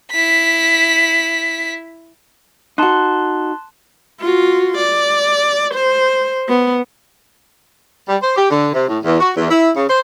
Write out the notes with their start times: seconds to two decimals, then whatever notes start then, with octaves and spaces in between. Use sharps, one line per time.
0.11 E4 B6
2.78 D#4 F#4 A5 C6 F#6
4.20 F4 F#4
4.77 D5
5.74 C5
6.49 B3
8.08 G3
8.22 C5
8.36 G4
8.50 D3
8.73 C3
8.88 A2
9.03 E2
9.20 F#4
9.36 E2
9.50 E4
9.76 C#3
9.89 C5